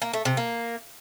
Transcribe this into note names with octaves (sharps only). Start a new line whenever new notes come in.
A#3
A3
C3
A#3